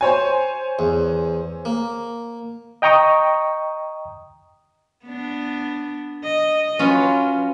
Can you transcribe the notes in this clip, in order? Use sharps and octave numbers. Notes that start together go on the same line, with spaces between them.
C5 C#5 G#5
E2
A#3
D#5 G5 A#5 C#6 D#6
B3 D4
D#5
F#3 C#4 F4 B4